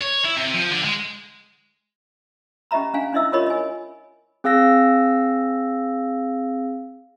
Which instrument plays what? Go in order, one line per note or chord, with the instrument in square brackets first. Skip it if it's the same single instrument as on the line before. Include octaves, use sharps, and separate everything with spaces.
[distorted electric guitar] C#5
E4
C3
F3
D3
G#3
[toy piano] C#4 G4 D#5 E5 A#5 B5
C#4 D4 F5 G#5
C#4 D4 E4 D#5 E5 E6
F4 G4 A#4 C#5 D#5 B5
D#5 G#5
[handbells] C4 G#4 F5 E6 A#6